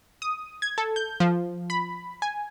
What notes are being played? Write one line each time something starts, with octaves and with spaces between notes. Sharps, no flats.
D#6
G#6
A4
G6
F3
B5
G#5